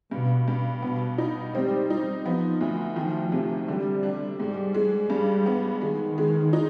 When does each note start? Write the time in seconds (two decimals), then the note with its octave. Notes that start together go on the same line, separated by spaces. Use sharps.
0.11 G2 B2
0.48 G2
0.82 B2 B3
1.18 D#4
1.54 G3 C4
1.90 D#4
2.25 F3 B3
2.61 D2
2.96 D#3 F3
3.32 C3
3.67 D3 G3
4.03 D4
4.39 G#2 G3
4.74 G#3
5.10 G2 G3
5.46 B3
5.81 D#3 G#3
6.18 G#3
6.53 D#4